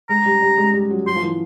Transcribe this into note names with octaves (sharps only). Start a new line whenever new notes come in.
G#3 A#5
G3
G3
G#3
G3
F#3
F#3 C6
F3
E3